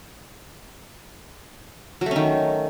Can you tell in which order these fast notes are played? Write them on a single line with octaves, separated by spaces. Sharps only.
F#3 A3 C#4 D#3